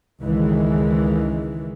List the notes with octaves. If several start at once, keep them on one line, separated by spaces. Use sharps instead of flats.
C#2 D#3 E3 G#3